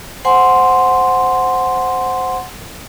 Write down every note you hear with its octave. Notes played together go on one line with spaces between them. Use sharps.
C5 F#5 G#5 C6